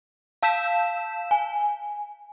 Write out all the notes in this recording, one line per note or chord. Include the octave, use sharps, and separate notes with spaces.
F5 A5 E6 G6 B6 E7
G#5